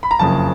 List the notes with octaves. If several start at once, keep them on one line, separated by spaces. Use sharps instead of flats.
B5
A#5
F#1 F2 C#3 A5